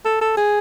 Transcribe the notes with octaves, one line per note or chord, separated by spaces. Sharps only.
A4
A4
G#4